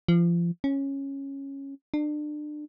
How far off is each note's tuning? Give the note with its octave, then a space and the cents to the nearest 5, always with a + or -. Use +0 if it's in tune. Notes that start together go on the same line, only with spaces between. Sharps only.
F3 -30
C#4 -10
D4 +30